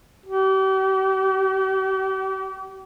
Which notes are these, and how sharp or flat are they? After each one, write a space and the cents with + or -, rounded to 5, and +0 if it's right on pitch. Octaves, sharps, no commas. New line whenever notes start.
G4 -40